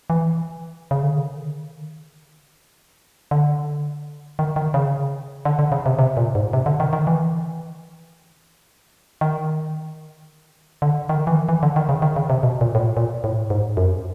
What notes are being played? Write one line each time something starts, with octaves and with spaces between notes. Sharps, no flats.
E3
C#3
D3
D#3
D3
D#3
D#3
C#3
D3
D3
C#3
C3
C3
A#2
G#2
C3
D3
D#3
D#3
E3
D#3
D3
D#3
E3
D#3
E3
D3
D#3
C#3
D#3
C#3
C3
B2
A#2
A2
A#2
A#2
A2
G#2
F#2